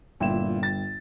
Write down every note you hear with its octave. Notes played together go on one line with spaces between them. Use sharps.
G1 A#2 E4 G5 E7
A6